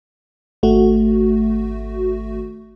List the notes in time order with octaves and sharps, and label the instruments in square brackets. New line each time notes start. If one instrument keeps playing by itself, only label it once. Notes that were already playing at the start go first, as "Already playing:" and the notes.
[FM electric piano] G#1 A3 F#4